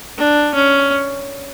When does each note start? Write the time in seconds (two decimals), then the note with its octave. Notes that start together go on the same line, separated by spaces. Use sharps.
0.18 D4
0.55 C#4